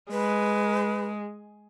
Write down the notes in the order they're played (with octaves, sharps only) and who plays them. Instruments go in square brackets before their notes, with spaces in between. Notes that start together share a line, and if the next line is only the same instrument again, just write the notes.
[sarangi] G#3 [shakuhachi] B4